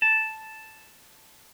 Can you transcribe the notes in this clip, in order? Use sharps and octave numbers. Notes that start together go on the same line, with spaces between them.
A5